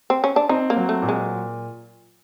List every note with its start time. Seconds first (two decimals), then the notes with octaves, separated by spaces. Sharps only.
0.10 C4
0.24 C#4
0.36 D4
0.49 C4 D#4
0.70 A#3
0.76 F#3
0.89 A3
1.02 A#2
1.09 G#3